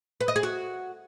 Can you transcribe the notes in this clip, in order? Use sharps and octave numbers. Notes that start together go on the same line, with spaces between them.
B4
D#5
G#4
F#4